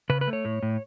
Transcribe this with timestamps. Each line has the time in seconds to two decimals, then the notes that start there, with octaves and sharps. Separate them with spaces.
0.10 C#3 B4
0.21 B4
0.28 A3
0.33 C#5
0.45 A2
0.63 A2